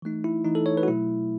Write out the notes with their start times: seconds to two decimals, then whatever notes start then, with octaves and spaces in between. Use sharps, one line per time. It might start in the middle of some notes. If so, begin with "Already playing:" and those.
0.02 E3 A3 D#4
0.24 E4
0.45 E3 A3 D#4
0.55 A4
0.66 C#5
0.77 B4
0.83 F#4
0.88 B2 F#3 A3 E4